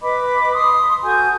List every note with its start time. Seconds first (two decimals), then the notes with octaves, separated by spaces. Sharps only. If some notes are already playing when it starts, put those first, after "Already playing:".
0.01 B4 D#5 B5 D6
0.53 C6 D#6
1.03 F#4 A4 G#5 G6